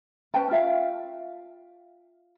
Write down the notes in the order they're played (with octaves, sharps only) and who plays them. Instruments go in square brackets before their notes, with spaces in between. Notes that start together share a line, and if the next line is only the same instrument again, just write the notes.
[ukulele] C#4 B4 G5 A5
F4 E5 F5